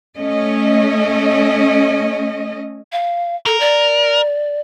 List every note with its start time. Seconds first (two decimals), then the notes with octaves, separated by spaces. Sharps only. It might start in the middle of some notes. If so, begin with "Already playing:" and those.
0.16 A3 C#4 D#5
2.92 F5
3.46 A4 A#4
3.60 D5